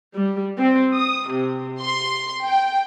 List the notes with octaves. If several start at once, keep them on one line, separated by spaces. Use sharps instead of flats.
G3
C4
D#6
C3
C6
G5